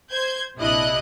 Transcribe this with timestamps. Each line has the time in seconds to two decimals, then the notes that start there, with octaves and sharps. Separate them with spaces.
0.12 C5 G6 G#6
0.57 A#1 C3 D4 E4 D#5 F#6